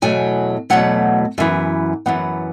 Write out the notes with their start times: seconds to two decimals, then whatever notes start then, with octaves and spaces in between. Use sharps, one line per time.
0.02 E2 B2 F#3 A3 G#5
0.70 E2 B2 F#3 A3 F#5
1.38 F#2 E3 B3 E5
2.06 F#2 E3 B3 F#5